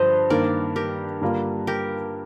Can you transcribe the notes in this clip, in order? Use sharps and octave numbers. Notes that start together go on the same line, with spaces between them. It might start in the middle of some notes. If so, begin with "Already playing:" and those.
Already playing: G2 D3 F3 C5 D#5
G2 D#3 A#3 A#4 D5
G4 A#4
G2 D3 G3 A#3 F4
G4 A#4